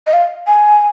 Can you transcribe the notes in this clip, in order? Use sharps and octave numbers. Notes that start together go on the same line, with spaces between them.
D#5
F5
G#5